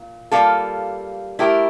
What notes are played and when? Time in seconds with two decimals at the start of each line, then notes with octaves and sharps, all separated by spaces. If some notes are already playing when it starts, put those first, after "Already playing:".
Already playing: A#2
0.31 G3 A#3 F4 A4
1.39 A3 E4 G4 A#4